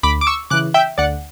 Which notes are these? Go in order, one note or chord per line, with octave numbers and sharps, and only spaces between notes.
D2 B5 D6
D6
C#6 E6
C#3 E3 D6 F#6
E5 G5
D2 D5 F#5